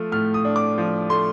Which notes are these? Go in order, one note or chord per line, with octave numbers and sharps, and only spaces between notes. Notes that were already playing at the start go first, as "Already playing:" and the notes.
Already playing: F3 A3
A2 F6
D#6
D4
D6
F3
A3 C6